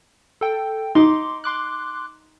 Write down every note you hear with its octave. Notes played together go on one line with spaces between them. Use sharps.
A4 G5
D#4 C6 D6
C6 D6 F#6